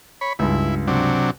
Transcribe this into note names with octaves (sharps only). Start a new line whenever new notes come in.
C#5 B5
C#2 G2 E4
C3 F#3 D4